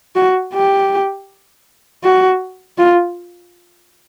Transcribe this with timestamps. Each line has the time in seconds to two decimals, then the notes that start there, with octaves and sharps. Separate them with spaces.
0.15 F#4
0.53 G4
2.04 F#4
2.78 F4